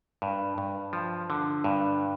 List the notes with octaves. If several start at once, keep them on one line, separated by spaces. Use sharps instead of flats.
G2
G2
F3
D3
G2